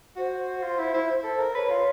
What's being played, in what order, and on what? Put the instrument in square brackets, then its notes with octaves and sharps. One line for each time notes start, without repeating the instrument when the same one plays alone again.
[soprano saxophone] F#4 [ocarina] C5
[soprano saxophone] F4
E4
E4
A4
A#4
[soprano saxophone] B4 [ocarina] C#5
[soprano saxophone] F4